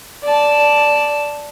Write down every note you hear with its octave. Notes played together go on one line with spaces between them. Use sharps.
D5 A5